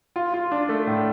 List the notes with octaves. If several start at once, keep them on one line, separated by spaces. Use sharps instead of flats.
F4
F4
D4
A3
A2